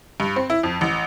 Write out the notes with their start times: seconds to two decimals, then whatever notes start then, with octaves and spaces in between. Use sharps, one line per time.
0.20 G2
0.36 C4
0.50 E4
0.63 F2
0.81 A1